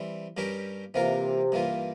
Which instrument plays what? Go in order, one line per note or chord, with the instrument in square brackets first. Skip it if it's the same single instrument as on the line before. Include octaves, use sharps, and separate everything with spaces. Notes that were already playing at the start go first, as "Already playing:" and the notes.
Already playing: [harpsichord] E3 G3 C4
G2 G3 C#4 G4 A#4
[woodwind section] C3 [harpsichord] E3 A#3 F4 A#4
[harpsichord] G2 E3 A#3 F4